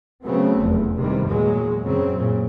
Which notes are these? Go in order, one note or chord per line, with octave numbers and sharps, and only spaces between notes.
C#3 F#3 A3 B3 C4
F1 E2
G2 C3 D#3 E3 G3
E2 A#2 F#3 G#3
F#2 C#3 F#3 C4
A#2 C#3